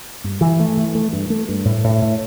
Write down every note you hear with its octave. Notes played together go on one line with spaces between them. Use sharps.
G2
E3
A3
E3
A3
G2
A3
G2
A2
A2
A2